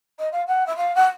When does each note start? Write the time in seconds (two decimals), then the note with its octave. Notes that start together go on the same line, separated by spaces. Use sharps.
0.18 D#5
0.32 F5
0.47 F#5
0.66 E5
0.76 F5
0.95 F#5